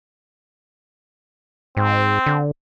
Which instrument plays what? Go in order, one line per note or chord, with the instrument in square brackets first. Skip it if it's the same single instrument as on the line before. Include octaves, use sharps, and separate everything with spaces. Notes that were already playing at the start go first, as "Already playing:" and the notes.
[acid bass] G#2 [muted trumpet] C4
[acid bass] D3